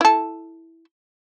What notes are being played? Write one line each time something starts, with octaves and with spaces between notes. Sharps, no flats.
E4 A4